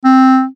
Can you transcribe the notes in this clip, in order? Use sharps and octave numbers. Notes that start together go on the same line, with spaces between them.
C4